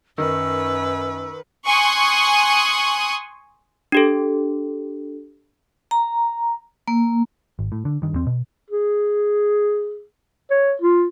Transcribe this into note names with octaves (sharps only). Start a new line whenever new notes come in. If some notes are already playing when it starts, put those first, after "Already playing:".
F#2 D#3 B4 E6
G#5 C6 C#6 D#6 F#6
D4 G4 A4
A#5
A#3
G#1
A2
D3
G2 D#3
E2 C4
B2
G#4
C#5
F4